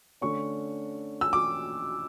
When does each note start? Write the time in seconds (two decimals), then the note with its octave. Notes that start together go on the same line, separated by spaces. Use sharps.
0.21 D3 A3 C#4 C#6
1.21 E6
1.33 D6